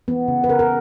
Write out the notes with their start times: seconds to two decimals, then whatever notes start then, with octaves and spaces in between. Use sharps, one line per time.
0.08 E3 B3
0.28 C#3
0.44 B4
0.49 C#3 A#4
0.59 A#4